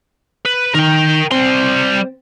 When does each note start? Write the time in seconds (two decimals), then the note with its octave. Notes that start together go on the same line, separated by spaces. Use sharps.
0.46 B4
0.75 D#3 A#4 G5
1.31 G3 C4 C6